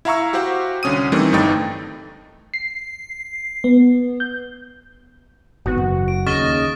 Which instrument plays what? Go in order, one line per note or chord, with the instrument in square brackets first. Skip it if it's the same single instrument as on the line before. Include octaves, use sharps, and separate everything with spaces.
[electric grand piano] E4 E5 F5 A#5 C#6 E6
F#4 G4 C5 F5 F#5
C2 D3 C#4 D#6 D#7
D#3 E3 G3 A3 C4
G1 G2 A3 D#4 G5 A6
[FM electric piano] C7
B3
G6
[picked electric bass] G#1 B3 [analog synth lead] F#4
[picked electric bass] F#1
[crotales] D7
[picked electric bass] D#2 C#3 [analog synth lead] D#5 [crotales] C#6 F6 A6